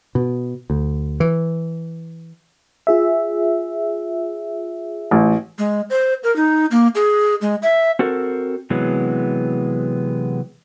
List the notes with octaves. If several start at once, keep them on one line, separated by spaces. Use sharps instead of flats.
B2
D2
E3
F4 G#4 E5
A1
G#3
C5
A#4
D#4
A#3
G#4
G#3
E5
C4 F#4 A4 A#4
C3 E3 F#3 G#3 B3